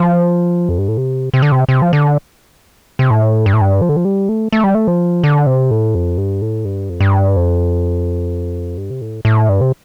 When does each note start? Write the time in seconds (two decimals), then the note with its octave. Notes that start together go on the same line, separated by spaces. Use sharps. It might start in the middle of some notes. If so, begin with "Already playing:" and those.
Already playing: F3
0.69 F2
0.78 G2
0.88 A2
0.97 C3
1.34 C3
1.42 D3
1.52 C3
1.69 C3
1.82 F3
1.93 D3
2.99 C3
3.10 A2
3.46 G2
3.53 A2
3.61 G2
3.81 F3
3.89 D3
3.96 F3
4.05 G3
4.29 A3
4.53 A3
4.64 G3
4.74 A3
4.87 F3
5.24 D3
5.46 C3
5.71 A2
5.95 F2
6.18 G2
6.42 A2
6.65 G2
6.90 F2
7.01 G2
7.36 F2
8.77 G2
8.90 C3
9.01 A2
9.25 A2
9.49 G2
9.61 C3